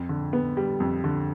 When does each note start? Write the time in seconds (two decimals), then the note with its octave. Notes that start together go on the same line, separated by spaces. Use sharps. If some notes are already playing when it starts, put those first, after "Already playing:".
Already playing: F2
0.09 D3
0.33 B3
0.57 G3
0.80 F2
1.04 D3